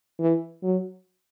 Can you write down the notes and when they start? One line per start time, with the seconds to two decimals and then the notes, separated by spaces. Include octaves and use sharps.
0.20 E3
0.63 F#3